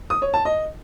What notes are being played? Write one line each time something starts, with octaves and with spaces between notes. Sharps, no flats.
D#6
C#5
A5
D#5